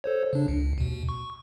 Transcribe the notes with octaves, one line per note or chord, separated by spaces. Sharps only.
A4 C5 C#5
C#3 D4
C#2
D#2 B2
C#6